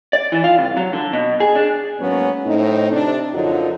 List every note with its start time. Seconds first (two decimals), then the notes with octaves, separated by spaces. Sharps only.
0.13 D5
0.32 E3
0.44 F4
0.58 C2
0.77 F#3
0.93 D3
1.13 B2
1.40 G#4
1.55 D4
2.00 G#2 F#3 A#3 B3 C#4
2.46 A2 C4 D#4
2.92 C3 D4
3.34 F#2 D3 F3 F#3 D#4 F4